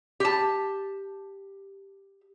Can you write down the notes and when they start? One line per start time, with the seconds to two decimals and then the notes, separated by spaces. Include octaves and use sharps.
0.20 G4 A5